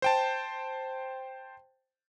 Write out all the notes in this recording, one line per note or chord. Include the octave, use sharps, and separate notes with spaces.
C5 G5 A5